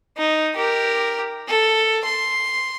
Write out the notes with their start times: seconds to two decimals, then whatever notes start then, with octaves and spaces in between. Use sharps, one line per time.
0.17 D#4
0.56 G4 A#4
1.48 A4
2.05 C6